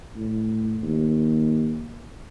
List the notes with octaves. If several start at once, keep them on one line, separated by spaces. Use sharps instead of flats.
A2
D#2